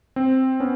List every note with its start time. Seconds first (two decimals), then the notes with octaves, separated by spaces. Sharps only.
0.16 C4
0.60 B3 C#4